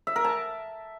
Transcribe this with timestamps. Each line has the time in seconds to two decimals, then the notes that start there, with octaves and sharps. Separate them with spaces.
0.07 E5
0.16 A#4
0.25 A5